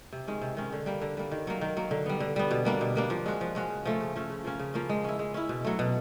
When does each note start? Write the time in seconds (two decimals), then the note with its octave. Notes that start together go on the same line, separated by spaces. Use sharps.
0.12 C3
0.28 D#3 G#3 C#4
0.41 C3
0.57 D#3 G#3 C#4
0.72 D3
0.86 G3 A#3
1.02 D3
1.17 G3 A#3
1.32 D#3
1.47 F#3 A#3
1.61 D#3
1.77 F#3 A#3
1.91 D3
2.06 G3 B3
2.20 D3
2.36 G3 B3
2.51 B2
2.65 G3 A#3 D4
2.81 B2
2.95 G3 A#3 D4
3.10 F3
3.26 G#3 C#4 F#4
3.41 F3
3.55 G#3 C#4 F#4
3.70 C#3
3.85 F3 A3 C#4
4.01 C#3
4.15 F3 A3 C#4
4.30 C#3
4.44 F3 A#3 C#4
4.59 C#3
4.74 F3 A#3 C#4
4.89 G#3
5.04 C#4 E4
5.19 G#3
5.34 C#4 E4
5.49 B2
5.65 F#3 A3
5.79 B2